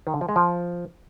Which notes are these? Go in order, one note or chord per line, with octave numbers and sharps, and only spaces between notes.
D#3
D3
F3
G#3
F3